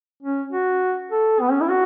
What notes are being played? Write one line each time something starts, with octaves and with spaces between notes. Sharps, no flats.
C#4
F#4
A4
B3
C#4
E4
F#4